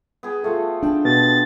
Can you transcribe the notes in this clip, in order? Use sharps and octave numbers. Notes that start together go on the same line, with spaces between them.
B3 G#4 G5
A3 F4 F#4 A4
D4 G5 A5
B2 A6